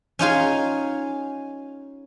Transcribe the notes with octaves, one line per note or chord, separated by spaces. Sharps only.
C#4 D#4 F4 G#4